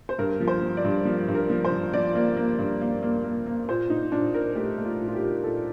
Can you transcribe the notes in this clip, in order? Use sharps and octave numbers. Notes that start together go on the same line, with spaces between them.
C5
G2 A#4
F3
C5
F3
D5
G2
F3
G2
A#4
F3
C5
F3
F3 D5
A#3
A#3
G2
A#3
A#3
A#3
A#3
A#2 C5
A#2 D#4
A#2 D4
A#2 A#4
A3 G4
A3
F4
A#2
F4
G4
A#2
A#2 A4